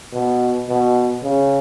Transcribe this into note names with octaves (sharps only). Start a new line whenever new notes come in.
B2
B2
C#3